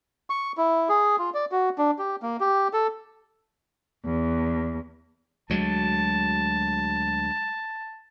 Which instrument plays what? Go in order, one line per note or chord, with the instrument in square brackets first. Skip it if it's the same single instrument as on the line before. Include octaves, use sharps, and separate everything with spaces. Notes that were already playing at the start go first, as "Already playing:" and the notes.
[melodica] C#6
E4
G#4
F4
D5
F#4
D4
G4
A#3
G4
A4
[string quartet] E2
[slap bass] D2 F#3 G#3 [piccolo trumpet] A5